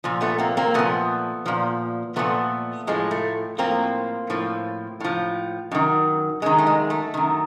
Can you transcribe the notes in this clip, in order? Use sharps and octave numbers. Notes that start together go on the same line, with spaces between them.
A#2 F3
A3 B3
A#3 C4
A#3 C4
A#2 F3 A3 B3
A#2 F3
A#2 F3 A3 B3
A2 F3 G#3
A3
A2 F3 A#3 C4
A2 F3
A2 F3
F#2 D#3
F#2 D#3 G#3
A3
G#3
A3
F#2 D#3